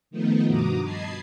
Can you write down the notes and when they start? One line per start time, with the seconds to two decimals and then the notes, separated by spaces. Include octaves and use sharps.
0.11 D#3 F3 A3 B3 D#4
0.47 G2 B2 F#4 A#5 D6 D#6
0.83 D#5 A5 B5 G#6 C7